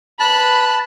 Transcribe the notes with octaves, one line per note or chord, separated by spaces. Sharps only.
B4 A5 B5 F#6